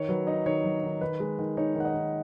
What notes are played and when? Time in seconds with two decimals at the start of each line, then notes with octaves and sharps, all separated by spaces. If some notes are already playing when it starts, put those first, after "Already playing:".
Already playing: D#3 C#5
0.09 F#3 B4
0.27 D#4 D#5
0.46 D#3 C#5
0.64 F#3
0.83 D#3
1.01 D#3 B4
1.20 G#3
1.39 D#3
1.57 D#4 C#5
1.75 D#3 F#5
1.85 D#5
1.94 D#3